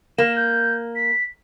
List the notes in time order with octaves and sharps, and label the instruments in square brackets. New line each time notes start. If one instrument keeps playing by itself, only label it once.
[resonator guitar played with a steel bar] A#3 [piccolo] E7
[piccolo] G6
B6